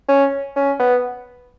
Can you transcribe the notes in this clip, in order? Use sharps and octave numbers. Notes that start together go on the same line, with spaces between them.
C#4
C#4
B3